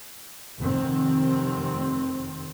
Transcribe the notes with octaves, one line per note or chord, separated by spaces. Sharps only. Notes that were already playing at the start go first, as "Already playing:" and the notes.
F1 D#3 C4